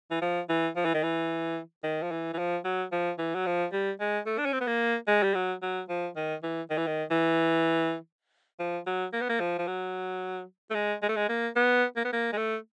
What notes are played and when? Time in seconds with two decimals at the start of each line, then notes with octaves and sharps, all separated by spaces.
0.11 E3
0.22 F3
0.49 E3
0.76 F3
0.85 E3
0.94 D#3
1.03 E3
1.84 D#3
2.03 F3
2.12 E3
2.33 E3
2.39 F3
2.65 F#3
2.92 F3
3.18 E3
3.35 F#3
3.46 F3
3.72 G3
4.00 G#3
4.26 A3
4.38 D4
4.46 C#4
4.53 C4
4.61 B3
4.67 A#3
5.07 G#3
5.23 G3
5.35 F#3
5.62 F#3
5.89 F3
6.16 D#3
6.43 E3
6.70 D#3
6.78 E3
6.87 D#3
7.11 E3
8.59 F3
8.86 F#3
9.13 A#3
9.21 B3
9.29 A#3
9.40 F3
9.59 F3
9.67 F#3
10.71 A3
10.75 G#3
11.03 G#3
11.09 A3
11.16 G#3
11.29 A#3
11.56 B3
11.96 A#3
12.05 B3
12.13 A#3
12.33 G#3
12.37 A3